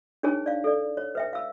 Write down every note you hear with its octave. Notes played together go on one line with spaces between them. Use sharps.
D4 D#4 G#4 A#4 C#5 G#5
D5 F5
A4 D5
C#5
B4 E5 G5
F5 E6